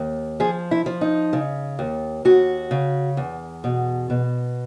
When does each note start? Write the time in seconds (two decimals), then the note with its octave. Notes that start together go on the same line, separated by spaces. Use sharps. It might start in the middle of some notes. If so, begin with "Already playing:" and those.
Already playing: D#2
0.40 F3 G#4
0.71 E4
0.86 F3
1.01 D#4
1.33 C#3
1.79 D#2
2.25 D#2 F#4
2.71 C#3
3.17 E2
3.64 B2
4.10 B2